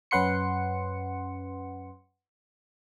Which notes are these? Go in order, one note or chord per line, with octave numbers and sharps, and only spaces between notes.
F#2 C#4 B4 F#5 C6 C#7